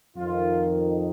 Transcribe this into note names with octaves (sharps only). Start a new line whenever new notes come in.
F2 D#3 F4